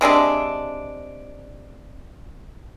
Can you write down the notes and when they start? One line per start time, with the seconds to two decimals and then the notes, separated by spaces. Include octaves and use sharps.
0.01 C3 G#3 D4 E5